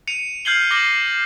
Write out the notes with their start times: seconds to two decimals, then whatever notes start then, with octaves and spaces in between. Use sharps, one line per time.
0.08 C#7 D#7 F7
0.45 F6 G6 G#6 C7 F#7 G7
0.71 D6 A#6 F#7 G7